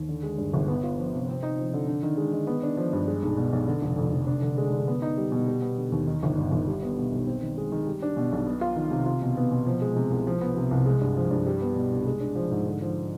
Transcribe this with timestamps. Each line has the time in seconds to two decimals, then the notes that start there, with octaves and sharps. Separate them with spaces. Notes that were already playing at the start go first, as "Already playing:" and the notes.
Already playing: D#2
0.09 D3
0.23 G#3
0.38 G2
0.54 G1
0.68 B3
0.84 F4
0.98 F3
1.13 C3
1.29 C4
1.43 D#4
1.58 F3
1.74 D3
1.88 D4
2.03 D#3
2.17 G#3
2.33 D#3
2.47 B3
2.63 D4
2.77 F3
2.93 G2
3.07 G#3
3.23 B1
3.37 B2
3.53 B1
3.68 D3
3.82 F1
3.97 F2
4.13 F1
4.27 D4
4.42 D3
4.58 G#3
4.73 D3
4.88 B3
5.02 D#4
5.17 G3
5.32 B2
5.47 G3
5.62 B3
5.78 D3
5.92 D#2
6.07 D#3
6.23 G1
6.38 G2
6.52 G1
6.67 G3
6.83 B3
6.97 B2
7.12 B1
7.26 C4
7.42 D#3
7.57 G#3
7.72 D#3
7.87 G3
8.02 D4
8.17 B2
8.32 B1
8.46 B3
8.61 F4
8.76 D#3
8.91 C3
9.06 F4
9.22 B2
9.37 B3
9.51 B2
9.66 F3
9.81 G#3
9.96 C3
10.11 C2
10.27 F3
10.41 B3
10.57 C3
10.71 C2
10.86 G#3
11.01 G2
11.17 F3
11.31 G2
11.47 G3
11.61 B3
11.76 B2
11.91 C2
12.07 G#3
12.20 D4
12.35 F3
12.51 G#2
12.67 D3
12.81 F3